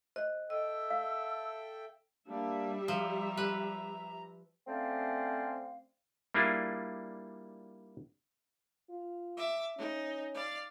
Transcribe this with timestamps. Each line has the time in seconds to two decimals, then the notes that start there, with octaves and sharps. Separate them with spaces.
0.16 C5 D#5
0.50 A4 D#5 E5 G5 E6
0.90 F5
2.28 G3 A#3 D4 E5
2.88 F3 A#5
3.37 B4
4.67 A3 C4 C#4 C5 D5 F5
6.34 G3 A#3 D4 E4 F4 G#4
8.90 F4
9.37 E5 D6
9.78 C#4 D#4
10.35 D5 F5